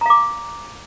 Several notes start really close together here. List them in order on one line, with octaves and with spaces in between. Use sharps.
A#5 F5 D6